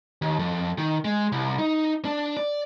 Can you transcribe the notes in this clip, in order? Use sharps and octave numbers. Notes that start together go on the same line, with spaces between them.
D#2
F2
D#3
G#3
C2
D#4
D4
D5